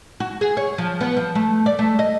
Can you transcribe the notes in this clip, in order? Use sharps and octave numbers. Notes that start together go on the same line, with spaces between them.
F#4
G#4
C#5
F3
B3
F3
A3
D5
A3
D#5